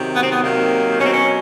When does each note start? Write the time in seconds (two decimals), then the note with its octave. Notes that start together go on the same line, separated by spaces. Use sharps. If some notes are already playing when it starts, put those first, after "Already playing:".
Already playing: C3 D#3 F#3
0.15 B3
0.22 C4
0.30 B3
0.43 C3 D#3 F#3 A#3
0.98 B2 F#3 C#4
1.06 C4
1.13 C#4